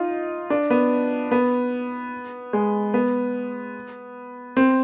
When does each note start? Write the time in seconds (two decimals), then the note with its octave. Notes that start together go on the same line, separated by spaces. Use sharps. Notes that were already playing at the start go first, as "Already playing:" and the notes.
Already playing: D#4 F4
0.50 D4
0.70 B3
1.31 B3
2.53 G#3
2.94 B3
4.57 C4